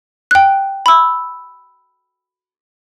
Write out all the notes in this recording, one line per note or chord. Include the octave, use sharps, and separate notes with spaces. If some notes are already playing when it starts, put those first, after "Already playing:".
G5 F#6
B5 E6